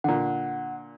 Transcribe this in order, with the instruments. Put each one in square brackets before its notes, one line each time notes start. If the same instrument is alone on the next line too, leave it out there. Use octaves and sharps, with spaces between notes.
[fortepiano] A#2 D3 [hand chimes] F#5